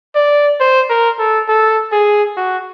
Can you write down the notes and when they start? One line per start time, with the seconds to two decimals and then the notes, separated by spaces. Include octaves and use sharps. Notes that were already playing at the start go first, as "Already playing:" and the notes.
0.15 D5
0.60 C5
0.89 A#4
1.19 A4
1.48 A4
1.92 G#4
2.37 F#4